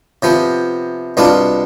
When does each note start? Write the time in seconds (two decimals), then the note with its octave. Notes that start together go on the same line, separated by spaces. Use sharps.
0.22 C3 F3 B3
1.17 C2 B2 B3 D4 F4